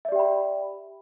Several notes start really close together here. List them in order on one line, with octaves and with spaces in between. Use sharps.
E5 D5 G4 G5 B5